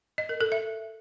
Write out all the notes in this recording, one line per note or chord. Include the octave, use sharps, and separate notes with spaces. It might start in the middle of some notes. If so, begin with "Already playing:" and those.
D#5
A#4
A4
E5